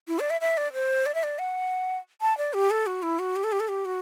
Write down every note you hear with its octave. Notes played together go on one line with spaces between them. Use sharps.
E4
D5
E5
E5
D5
C5
D5
E5
D5
F#5
A5
D5
G4
A4
F#4
E4
F#4
G4
A4
G4
A4
G4
F#4